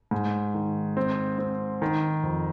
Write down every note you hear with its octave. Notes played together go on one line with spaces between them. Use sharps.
G#2
D#3
C4
C4
D#3
F2